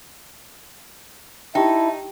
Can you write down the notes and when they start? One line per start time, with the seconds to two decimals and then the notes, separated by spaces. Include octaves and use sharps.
1.55 D#4 E4 G4 G5 A5